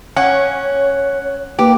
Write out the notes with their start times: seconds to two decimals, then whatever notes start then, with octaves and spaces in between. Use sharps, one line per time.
0.16 C#4 C#5 F#5
1.59 A#3 G4 B4